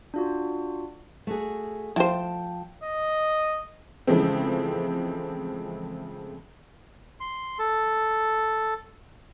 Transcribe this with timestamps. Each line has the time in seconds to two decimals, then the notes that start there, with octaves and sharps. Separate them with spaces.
0.14 D4 F4 F#4
1.27 A3 F#4 G#4
1.96 F3 E4 C5 G5 A5
2.84 D#5
4.07 C#3 E3 F3 G#3 A3 C4
7.20 C6
7.59 A4